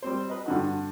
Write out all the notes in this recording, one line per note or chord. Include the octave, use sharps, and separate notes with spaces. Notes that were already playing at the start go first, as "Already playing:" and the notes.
G3 C4 C5
B4 D#5
G2 D3 F#4